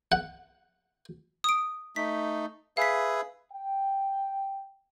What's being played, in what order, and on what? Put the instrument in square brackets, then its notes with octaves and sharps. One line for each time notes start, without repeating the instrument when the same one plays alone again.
[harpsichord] F#5
[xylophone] D#6 D7
[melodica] A3 D#4 [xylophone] B6
[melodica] G#4 B4 E5 [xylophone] F5 B6
[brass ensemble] G5